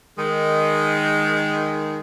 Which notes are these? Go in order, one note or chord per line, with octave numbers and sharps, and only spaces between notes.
D#3 G#3